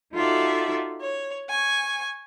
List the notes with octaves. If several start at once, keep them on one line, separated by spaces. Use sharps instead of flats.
D#4 F4 F#4 A4 D5 E5
C#5
G#5 C#6